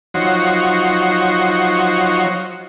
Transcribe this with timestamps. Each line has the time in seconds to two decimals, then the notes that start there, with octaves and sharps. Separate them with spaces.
0.14 F3 F#3 D#4 F#4 C5 C#5